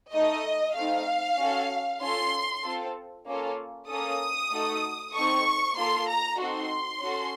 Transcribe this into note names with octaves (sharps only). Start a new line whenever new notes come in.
A3 D#4 A4 D#5
A3 C4 D#4 F5
C#4 F#4 A4
C#4 F4 A4 C6
C4 F4 A4
A#3 C#4 F4 A4
A#3 C#4 A4 D#6
A3 D#4 F#4 A4
C4 D#4 A4 C#6
A#3 F4 A4 C6
A#5
C4 D#4 F#4 A4 C6
C#4 F#4 A4